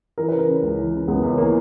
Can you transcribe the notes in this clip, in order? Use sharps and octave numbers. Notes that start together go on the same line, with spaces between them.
E3 A#4
C#3 B4
A#4
C#3
C#2
E3
C#3
C#2 B3
C#2 C#4
E3 A#3